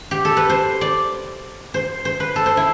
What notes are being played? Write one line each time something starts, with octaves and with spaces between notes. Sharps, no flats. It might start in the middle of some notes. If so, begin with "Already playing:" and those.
Already playing: F4
G4
A4
B4
C5
D5
C5
C5
B4
A4
C5
E4